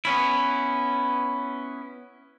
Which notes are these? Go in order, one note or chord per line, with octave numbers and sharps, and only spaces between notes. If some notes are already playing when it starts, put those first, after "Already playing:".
B3 C#4 E4